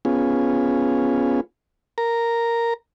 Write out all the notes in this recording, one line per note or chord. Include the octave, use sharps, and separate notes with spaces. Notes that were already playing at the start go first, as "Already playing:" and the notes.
B3 C#4 F4 G#4
A#4 A#5